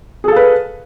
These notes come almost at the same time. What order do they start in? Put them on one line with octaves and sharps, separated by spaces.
G#4 A4 F5 B4